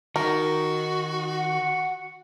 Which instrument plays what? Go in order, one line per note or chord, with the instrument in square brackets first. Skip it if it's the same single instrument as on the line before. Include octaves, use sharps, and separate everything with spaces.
[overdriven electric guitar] D#3 [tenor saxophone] F#4 [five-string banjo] A#4
[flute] F#5